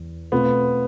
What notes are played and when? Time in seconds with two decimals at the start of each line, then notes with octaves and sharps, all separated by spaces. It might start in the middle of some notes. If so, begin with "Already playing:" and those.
Already playing: E2 E3
0.32 B2 A3 B3 C4 F4